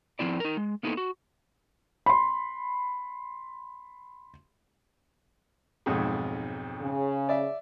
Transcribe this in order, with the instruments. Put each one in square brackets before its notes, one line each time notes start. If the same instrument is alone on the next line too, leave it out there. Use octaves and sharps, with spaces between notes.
[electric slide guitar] F3 C4 E4 D5
D#4 A#4
G#3
A#3 B3 D#4 E4 G#4 A4
F#4
[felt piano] B5 C6
[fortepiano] B1 F2 G#2
[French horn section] C#3
[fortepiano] D5 E5